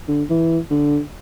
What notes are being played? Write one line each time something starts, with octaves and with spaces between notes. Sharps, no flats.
D3
E3
D3